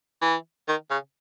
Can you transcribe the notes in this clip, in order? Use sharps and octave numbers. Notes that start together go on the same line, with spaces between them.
E3
D#3
C#3